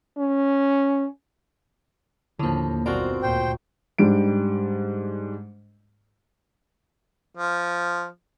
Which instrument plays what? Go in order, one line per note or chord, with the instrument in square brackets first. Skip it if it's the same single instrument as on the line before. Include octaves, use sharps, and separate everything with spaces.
[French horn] C#4
[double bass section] D#2 [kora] A2 F3 [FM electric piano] D3 A#3
[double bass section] G1 B2 C4 [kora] A#3 F4 F#4 [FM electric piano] D5 G#5
[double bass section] D2 A#2 [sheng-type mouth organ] C5 G5
[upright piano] G#2 G3 D4 D7
[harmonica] F3